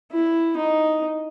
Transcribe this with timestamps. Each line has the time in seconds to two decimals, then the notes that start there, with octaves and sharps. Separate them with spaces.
0.12 E4
0.57 D#4